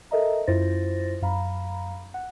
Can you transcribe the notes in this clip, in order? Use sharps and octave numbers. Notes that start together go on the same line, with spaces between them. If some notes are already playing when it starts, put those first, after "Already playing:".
A4 A#4 D#5 E5 A#5
F#2 E4 F4 C5 A6 A#6
F#2 F5 A#5 B5
F#5